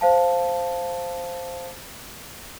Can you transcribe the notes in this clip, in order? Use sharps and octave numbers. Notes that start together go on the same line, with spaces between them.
C5 F5 A5